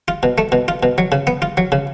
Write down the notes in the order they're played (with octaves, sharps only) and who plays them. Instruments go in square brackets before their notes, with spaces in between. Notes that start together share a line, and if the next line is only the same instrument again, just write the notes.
[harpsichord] F4
B2
A3
B2
F4
B2
F#3
C#3
B3
F4
F#3
C#3